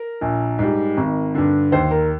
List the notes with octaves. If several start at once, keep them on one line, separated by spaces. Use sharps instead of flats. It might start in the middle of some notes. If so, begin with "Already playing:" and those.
Already playing: A#4
A#1
G#2 G3
G#1
G2 D3
D#2 C5
A#4